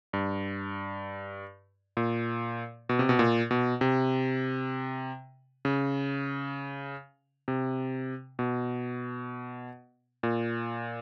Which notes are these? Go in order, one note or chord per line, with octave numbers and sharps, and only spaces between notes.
G2
A#2
B2
C3
B2
A#2
B2
C3
C#3
C3
B2
A#2